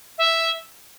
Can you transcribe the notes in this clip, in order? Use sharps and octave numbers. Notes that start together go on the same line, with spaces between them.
E5